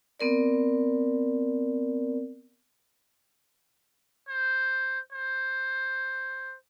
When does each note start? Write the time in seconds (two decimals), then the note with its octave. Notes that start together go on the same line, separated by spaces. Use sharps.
0.20 B3 C4 A#4 D5
4.28 C5
5.13 C5